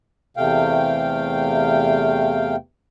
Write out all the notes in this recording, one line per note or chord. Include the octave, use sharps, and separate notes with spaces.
E2 C3 A3 F5 G5